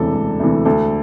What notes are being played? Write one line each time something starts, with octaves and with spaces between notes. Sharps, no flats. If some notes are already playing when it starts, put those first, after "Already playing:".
Already playing: E1 D2 C3 E3 A4
E1
D2 C3 E3
D2 A4